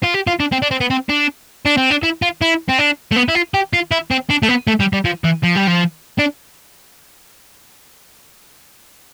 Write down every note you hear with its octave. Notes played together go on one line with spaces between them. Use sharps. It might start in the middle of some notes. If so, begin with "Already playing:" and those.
F4
G4
F4
D4
C4
D4
C4
B3
C4
D4
D4
C4
D4
E4
F4
E4
C4
D4
A3
B3
E4
F4
G4
F4
E4
C4
D4
A3
B3
A3
G3
G3
F3
E3
F3
G3
F3
D4